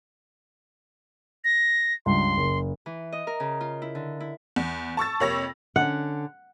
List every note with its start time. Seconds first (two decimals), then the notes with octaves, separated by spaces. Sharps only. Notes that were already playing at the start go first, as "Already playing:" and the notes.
1.44 A#6
2.06 C#2 G2 C#3 C6
2.37 F#1
2.86 E3
3.12 D#5
3.27 A#4
3.40 C#3
3.61 F4
3.82 E4
3.95 D3
4.20 E4
4.56 E2
4.97 A5 C#6 E6 A6
5.20 F2 C3 A#3 C#5 E6 A#6
5.76 D3 C#4 F#5